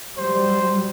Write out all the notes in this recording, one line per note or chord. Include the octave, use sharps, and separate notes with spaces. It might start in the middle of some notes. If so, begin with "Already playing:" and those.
F#3 G3 C5